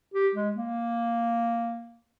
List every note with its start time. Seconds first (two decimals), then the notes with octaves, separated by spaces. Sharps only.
0.14 G4
0.35 G#3
0.56 A#3